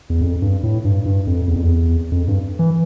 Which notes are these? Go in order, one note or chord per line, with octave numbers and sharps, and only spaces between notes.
E2
F2
G2
A2
G2
G2
F2
E2
F2
E2
F2
G2
E3